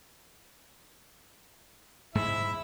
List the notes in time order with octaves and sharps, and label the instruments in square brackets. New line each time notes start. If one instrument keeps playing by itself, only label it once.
[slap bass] G#2 G#3 [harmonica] E4 E5